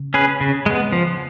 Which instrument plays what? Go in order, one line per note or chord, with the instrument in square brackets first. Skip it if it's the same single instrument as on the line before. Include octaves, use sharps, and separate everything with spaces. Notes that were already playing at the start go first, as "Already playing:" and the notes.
Already playing: [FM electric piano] C#3
[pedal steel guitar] C#4 G#4 B4
C#3
G#3 B3
F3